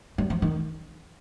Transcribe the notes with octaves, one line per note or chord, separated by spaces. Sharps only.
G3
F3
D#3